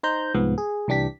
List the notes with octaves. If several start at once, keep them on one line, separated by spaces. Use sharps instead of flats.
D#4 C5 A#5 G6
C2 G#2 F3 B3
G#4
C2 E3 D4 G4 B6